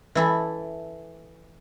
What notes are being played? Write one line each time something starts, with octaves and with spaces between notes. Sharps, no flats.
E3 E4 A4